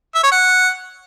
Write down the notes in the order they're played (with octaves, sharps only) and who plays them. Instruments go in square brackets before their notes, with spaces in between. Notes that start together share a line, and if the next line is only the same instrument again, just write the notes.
[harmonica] E5
C#5
F#5